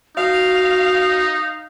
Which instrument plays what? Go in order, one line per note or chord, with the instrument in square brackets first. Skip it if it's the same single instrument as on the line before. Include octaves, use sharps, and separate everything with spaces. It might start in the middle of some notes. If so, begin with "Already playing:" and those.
[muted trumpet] D#4 [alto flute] F#4 [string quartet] F5